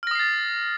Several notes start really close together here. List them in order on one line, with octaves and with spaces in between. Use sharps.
F6 A#6 D#6 C7 A6